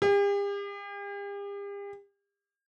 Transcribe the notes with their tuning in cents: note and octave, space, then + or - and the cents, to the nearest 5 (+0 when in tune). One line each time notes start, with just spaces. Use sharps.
G4 +45